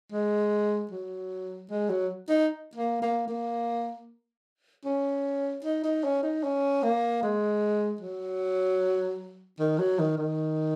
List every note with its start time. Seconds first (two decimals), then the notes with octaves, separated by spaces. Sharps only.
0.12 G#3
0.91 F#3
1.70 G#3
1.90 F#3
2.29 D#4
2.75 A#3
3.02 A#3
3.28 A#3
4.85 C#4
5.64 D#4
5.84 D#4
6.04 C#4
6.23 D#4
6.44 C#4
6.83 A#3
7.23 G#3
8.01 F#3
9.59 D#3
9.79 F#3
9.99 D#3
10.18 D#3